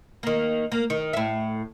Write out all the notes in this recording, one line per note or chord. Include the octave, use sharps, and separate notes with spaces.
D#3 A#3
A#3
D#3
A2 E5